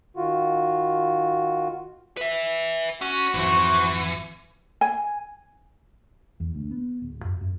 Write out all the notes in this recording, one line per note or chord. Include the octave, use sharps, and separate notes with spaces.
D#3 F4 F#4
B4 E5
C#4 F#4
G#1 F2 E3 C5 C#6
G#5
E2
D2
B3
D1
F#2
F#2